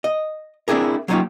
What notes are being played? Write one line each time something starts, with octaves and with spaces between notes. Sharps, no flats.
D#5
C4 D4 E4 G#4 A#4
F#3 A#3 C#4 D#4 F4 G4